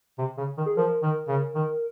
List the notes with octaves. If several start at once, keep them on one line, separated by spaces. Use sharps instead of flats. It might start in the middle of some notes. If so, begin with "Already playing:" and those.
C3
C#3
D#3
G#4
F3 A#4
D#3
C#3
D#3